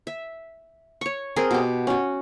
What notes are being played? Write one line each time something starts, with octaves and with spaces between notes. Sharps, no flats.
E5
C#5 C#6
C4 G#4 A#4
B2 G4
C#4 F#4